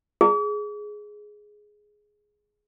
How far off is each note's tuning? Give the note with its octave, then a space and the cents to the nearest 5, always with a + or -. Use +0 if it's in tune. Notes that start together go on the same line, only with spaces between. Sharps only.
G#4 +5